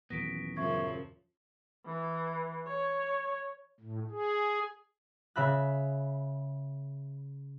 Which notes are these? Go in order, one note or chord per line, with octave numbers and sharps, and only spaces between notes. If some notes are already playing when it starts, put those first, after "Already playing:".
D#1 E3 F#3 B3 A#6 B6 D7
F#2 C#3 F3 E5 C#6 G#6
E3
C#5
A2
G#4
C#3 E5 B5 F#6